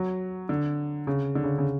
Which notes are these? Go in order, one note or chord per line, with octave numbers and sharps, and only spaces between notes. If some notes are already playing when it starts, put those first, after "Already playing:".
Already playing: F#3
D3
C#3
D3
C#3
C#3